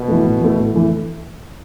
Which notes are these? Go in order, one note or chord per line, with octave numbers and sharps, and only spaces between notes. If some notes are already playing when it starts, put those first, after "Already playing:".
Already playing: B2
E3 A3
A2
E3 A3
A2
E3 A3